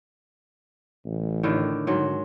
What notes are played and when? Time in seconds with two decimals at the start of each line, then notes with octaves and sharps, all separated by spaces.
1.06 A1
1.43 A2 D3 D#3
1.87 G#2 D3 F#3